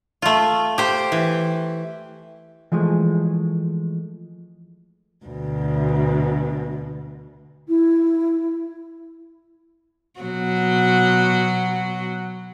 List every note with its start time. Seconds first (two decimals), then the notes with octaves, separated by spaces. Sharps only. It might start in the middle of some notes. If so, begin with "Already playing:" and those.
0.22 A3 F4
0.78 G4 C5
1.12 E3
2.72 E3 F3 G#3 A3
5.26 D2 B2
7.68 E4
10.21 B2 F#3 F#4